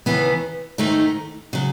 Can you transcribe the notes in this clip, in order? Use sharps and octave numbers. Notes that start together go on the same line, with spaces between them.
D#2 C#3 E3 B3
G#2 D#3 A3 D#4
C#3 F#3